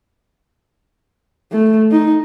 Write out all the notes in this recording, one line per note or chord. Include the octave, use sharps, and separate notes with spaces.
A3
D#4